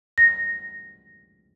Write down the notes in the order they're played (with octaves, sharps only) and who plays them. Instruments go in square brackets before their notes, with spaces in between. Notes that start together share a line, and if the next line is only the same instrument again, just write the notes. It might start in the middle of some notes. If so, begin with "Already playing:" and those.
[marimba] A#6